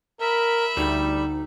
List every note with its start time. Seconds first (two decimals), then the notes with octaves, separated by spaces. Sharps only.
0.21 A#4 E5 B5
0.77 D2 G3 D#4